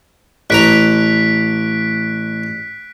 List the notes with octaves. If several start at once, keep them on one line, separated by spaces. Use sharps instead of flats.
A1 B4 A#5 F#6 B6 D7